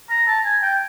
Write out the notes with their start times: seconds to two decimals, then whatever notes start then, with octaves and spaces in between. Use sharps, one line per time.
0.10 A#5
0.28 A5
0.45 G#5
0.62 G5